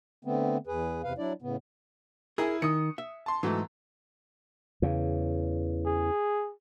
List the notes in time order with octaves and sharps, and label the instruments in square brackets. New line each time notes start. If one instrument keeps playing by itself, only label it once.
[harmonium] D3 A3 B3 C4
E2 G#4 B4
E2 C3 B4 F5
F#3 D4 E4 D5
A2 C#3 B3
[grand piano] E4 G#5 [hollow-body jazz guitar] G#4 A#4
[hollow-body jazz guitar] D#3 [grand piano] D#6 C#7
[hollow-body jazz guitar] E5
[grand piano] A5 C6
[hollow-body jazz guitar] G#2 [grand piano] E3 F#3 A3
[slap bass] E2 C#3
[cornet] G#4